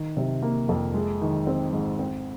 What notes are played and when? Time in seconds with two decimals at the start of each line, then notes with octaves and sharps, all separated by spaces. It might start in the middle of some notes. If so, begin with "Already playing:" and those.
Already playing: D#3
0.17 C3
0.42 A#3
0.69 F2
0.94 G#3
1.22 D#3
1.47 C4
1.73 G#2
1.99 C4